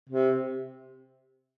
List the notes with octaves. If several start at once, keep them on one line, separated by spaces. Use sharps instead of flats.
C3